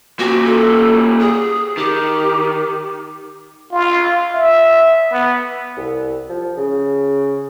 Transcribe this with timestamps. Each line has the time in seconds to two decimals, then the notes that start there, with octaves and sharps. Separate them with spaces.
0.19 A#2 F#4 G4
0.45 A4
1.20 G#4
1.77 D#3 G4
3.72 F4
4.34 E5
5.11 B3
5.77 C2
6.29 F3
6.57 C#3